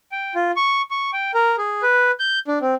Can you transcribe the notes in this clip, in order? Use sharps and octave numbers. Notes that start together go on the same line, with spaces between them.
G5
F4
C#6
C#6
G5
A#4
G#4
B4
G6
D4
C4